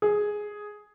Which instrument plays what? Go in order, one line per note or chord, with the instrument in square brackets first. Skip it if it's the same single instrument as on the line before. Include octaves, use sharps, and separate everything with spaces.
[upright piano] G#4